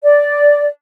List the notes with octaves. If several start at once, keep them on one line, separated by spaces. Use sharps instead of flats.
D5